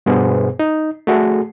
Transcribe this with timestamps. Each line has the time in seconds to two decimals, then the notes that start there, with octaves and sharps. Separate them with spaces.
0.06 G2 B2 B3 G#4 C5
0.59 D#4
1.07 A3 F#4 G#4 A4